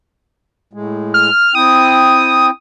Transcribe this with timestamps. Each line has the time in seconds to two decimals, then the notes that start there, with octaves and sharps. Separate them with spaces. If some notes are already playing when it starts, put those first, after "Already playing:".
0.73 A2 G#3
1.14 F6
1.55 C4 E4 G5 D#6